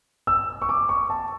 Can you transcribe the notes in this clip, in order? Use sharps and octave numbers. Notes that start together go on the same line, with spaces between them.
E6
C#6
D6
C#6
A5